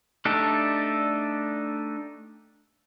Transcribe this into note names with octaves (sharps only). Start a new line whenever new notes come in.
A3 D4 D#4 G4 A4